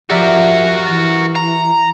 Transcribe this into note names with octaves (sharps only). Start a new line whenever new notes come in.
F3 F#4 G4 A#4 D5 E5
E3 A6
A#5 C#6